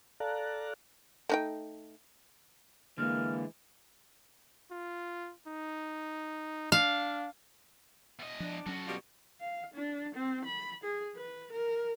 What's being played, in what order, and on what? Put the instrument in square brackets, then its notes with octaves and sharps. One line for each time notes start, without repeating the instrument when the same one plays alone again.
[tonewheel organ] A4 D5 F5 A5 A#5 F#6
[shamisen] A3 D#4 G5
[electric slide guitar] D3 G#3 [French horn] E3 [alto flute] A#3 [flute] F6
[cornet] F4
D#4
[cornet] D4 [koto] F5
[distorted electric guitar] E2 D#5
[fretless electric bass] F3 [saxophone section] D4
[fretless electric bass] F#3 C#4 [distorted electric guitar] F#4 A4
[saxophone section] B2 G3 F4
[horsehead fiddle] F5
D4
C4
B5
G#4
B4
A#4